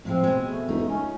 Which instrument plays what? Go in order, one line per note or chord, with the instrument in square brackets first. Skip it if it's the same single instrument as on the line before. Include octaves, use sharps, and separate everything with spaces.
[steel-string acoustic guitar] A2 F3 G#3 [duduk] C4
[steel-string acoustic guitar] B2 G#3
[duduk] A3
[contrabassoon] E1 [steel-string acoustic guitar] D#4
[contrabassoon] C#2 [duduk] C#4